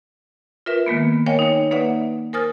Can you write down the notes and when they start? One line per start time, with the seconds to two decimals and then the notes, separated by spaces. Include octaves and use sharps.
0.66 F4 A#4 B4 E5
0.86 D#3 G#3 A#3 B3
1.26 A#4 C#5 D#5 F5 G5 G#5
1.39 D#4 C#5
1.71 A#3 D#4 B4 D5 E5 F#5
2.33 A#4 C5 G#5 D#6 F6 A6